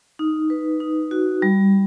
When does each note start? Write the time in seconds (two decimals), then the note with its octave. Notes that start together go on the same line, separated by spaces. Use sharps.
0.19 D#4
0.50 B4
0.80 D#4
1.11 F#4
1.42 G3